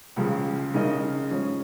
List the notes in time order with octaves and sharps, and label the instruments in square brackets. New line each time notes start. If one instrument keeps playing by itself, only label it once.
[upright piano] C#2 C#3 F3 G#3
C#3 G#3 D#4 A#4 D#5
G#2 F3 C#4